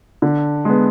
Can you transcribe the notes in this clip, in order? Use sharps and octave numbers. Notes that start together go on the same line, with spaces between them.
D3
G#3 B3